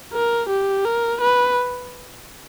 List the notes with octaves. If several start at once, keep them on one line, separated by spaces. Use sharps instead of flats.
A#4
G4
A#4
B4